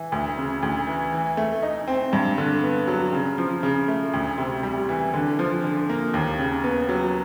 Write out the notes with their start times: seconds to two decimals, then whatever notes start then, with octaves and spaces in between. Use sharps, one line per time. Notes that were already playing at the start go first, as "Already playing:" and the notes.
Already playing: E3
0.12 D2
0.38 C#3
0.63 D2
0.87 E3
1.13 E3
1.37 A3
1.62 D#4
1.88 C4
2.13 G2
2.38 D3
2.63 B3
2.88 F#3
3.13 C#3
3.38 F3
3.63 C#3
3.88 A3
4.14 D2
4.38 C3
4.63 G3
4.89 E3
5.14 D3
5.39 F3
5.64 D3
5.89 A#3
6.14 D#2
6.39 C#3
6.64 B3
6.89 F#3